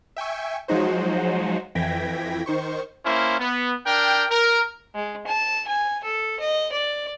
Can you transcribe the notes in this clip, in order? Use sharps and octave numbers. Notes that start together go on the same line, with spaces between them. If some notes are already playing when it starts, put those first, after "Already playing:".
E5 G5 G#5 C#6
F3 F#3 G#3 D#4 F#4 C5
F2 E3 G5 G#6 A#6 B6
D#3 C5 C#6
A#3 C#4 E4 C5
B3
D4 A#4 G5
A#4
G#3
A5
G#5
A4
D#5
D5